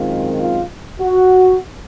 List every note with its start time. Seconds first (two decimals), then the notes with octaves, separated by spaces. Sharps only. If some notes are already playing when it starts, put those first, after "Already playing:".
Already playing: F#2 D#3 G#3 C4 F4
0.38 F4
1.01 F#4